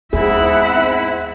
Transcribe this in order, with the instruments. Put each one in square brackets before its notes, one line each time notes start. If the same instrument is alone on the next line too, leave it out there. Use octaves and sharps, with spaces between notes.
[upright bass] D#2 B3 [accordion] G#2 C4 E4 [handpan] G#4 [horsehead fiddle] E5 F#5